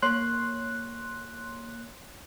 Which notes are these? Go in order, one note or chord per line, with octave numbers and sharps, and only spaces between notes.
A#3 C#5 C6 F#6